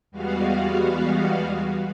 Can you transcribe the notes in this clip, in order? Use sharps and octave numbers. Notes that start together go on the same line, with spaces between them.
E2 G3 G#3 B3 F#4 F5